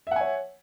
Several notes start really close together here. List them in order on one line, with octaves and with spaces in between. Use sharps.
E5 F#5 G#5 C#5